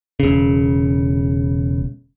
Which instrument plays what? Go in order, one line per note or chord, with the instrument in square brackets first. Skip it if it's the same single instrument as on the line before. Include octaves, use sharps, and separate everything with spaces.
[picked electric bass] E1 C#3